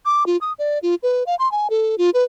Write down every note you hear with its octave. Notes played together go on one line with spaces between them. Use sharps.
D6
F4
D#6
D5
F4
B4
F5
C6
G#5
A4
F4
B4